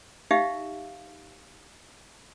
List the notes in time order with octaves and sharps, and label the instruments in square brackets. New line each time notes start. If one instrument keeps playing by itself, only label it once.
[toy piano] D#4 G4 E5 F5